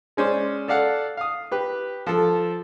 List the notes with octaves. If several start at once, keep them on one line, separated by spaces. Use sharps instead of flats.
G#3 C#4 C5 D5
A4 D5 F5 F#5
F5 D#6
G4 B4
F3 A4